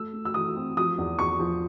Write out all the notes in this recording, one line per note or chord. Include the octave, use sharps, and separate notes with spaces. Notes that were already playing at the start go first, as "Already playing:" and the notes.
Already playing: A3 E6
A3
E6
E3 D#6
C4
F3 D#6
E2
E2 C#6
F3